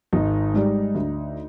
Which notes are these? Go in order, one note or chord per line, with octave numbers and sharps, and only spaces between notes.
G#1 D#4
G#2 G3
D2